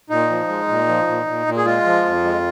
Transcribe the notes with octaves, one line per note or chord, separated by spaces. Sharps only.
A#2 D#4
F3
G#3
A#2
F3
A#2
A#2
A#2
G#4
G#3 F4
F3
F2
G#3